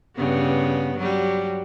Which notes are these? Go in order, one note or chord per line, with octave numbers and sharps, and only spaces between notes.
G2 C#3 B3
F#3 G3